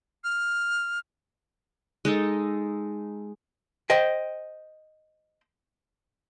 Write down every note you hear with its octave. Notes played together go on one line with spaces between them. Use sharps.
F6
G#3 D#4 A4
C5 D#5 G5